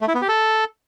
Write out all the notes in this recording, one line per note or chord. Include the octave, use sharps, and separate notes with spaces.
A3
E4
B3
G4
A4